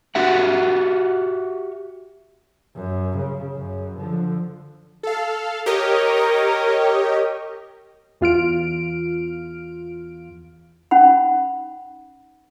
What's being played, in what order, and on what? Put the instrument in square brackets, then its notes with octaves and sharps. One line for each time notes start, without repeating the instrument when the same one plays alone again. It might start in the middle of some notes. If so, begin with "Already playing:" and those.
[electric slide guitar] F#4 G4 E5 F#5
[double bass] F#2
C#3
F#2 C#3
D3 F3
[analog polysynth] A4 F5
[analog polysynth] G4 C#5 D#5 [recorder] A#4
[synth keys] E2 F4 F6 D7
[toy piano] C#4 D#4 F#5 B5